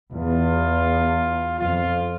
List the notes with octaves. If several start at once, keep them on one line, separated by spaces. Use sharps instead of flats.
E2 F4
F2 F4